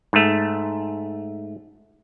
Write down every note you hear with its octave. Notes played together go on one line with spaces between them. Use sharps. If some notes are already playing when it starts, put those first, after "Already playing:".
G#2 A3